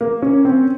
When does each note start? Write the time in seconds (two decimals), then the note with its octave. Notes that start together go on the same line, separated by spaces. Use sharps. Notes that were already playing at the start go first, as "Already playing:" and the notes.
0.01 A#3
0.22 C#4
0.45 C4